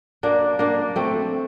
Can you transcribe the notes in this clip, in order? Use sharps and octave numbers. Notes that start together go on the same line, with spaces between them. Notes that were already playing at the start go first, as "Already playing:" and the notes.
A#3 D4
A#3 D4
A3 C4